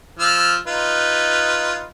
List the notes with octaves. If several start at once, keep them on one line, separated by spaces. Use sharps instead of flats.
F3 E6 F6
D#4 F4 B4